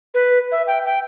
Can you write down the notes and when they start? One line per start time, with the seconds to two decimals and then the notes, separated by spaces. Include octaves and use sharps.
0.14 B4
0.52 E5
0.67 G5
0.86 G5